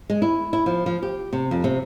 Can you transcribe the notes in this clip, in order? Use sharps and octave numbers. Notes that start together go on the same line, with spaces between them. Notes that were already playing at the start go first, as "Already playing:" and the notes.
G#3
E4
E4
F3
F3
G4
C3
F2
C3